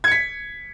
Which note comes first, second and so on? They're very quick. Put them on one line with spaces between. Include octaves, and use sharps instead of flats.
G#6 C#7 B6